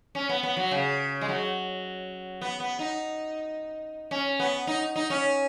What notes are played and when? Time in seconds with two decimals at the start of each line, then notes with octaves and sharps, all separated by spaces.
0.15 C#4
0.29 B3
0.43 B3
0.57 F#3
0.71 C#3
1.21 G#3
1.28 F#3
2.41 B3
2.60 B3
2.79 D#4
4.11 C#4
4.40 B3
4.67 D#4
4.96 D#4
5.10 C#4